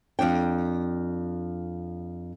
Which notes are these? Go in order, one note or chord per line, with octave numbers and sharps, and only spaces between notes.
F2 G#2 D4 G5